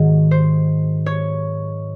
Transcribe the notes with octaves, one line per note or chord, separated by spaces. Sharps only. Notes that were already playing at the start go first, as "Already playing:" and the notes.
Already playing: G#2 D#3 F#3
C5
C#5